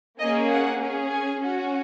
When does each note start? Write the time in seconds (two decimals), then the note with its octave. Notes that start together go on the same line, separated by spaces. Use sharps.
0.19 A#3 C#4 G#4 D#5
0.50 F#5
0.81 C#4 G#4
1.10 G#5
1.41 C#4 F#4